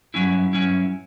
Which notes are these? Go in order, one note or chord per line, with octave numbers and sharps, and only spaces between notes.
G2 F#3 C#4 E4
G2 F#3 C#4 E4